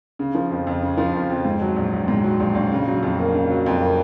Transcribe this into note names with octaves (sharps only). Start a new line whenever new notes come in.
C#3
F3
F2
F2
C#3
F3
F2
F2
G#2
F#3
A#1
A#1
G#2
F#3
A#1
A#1
C#3
F#3
F2
A#3
C#3
F#3
F2
A#3